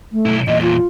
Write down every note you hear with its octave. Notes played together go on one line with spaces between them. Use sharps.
A3
B1 E4
E2 A#2 D#5
F4